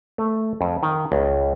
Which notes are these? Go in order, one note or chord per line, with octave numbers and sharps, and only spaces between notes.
A3
F2
D#3
C#2